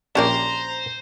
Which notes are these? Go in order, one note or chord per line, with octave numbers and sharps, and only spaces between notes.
A#1 A#3 C#4 G4 C5 D5 A5 A#5